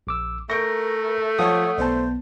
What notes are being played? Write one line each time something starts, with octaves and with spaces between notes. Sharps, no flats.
A#1 D6 E6
A3 A#4 C#6 G6 A#6 D7
F3 C#5 F#5 D#6
B1 B3 C5 D5 A5